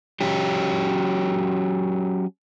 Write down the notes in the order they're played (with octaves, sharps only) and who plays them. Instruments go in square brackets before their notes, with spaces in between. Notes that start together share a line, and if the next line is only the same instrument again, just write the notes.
[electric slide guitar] F#3 C#4 G4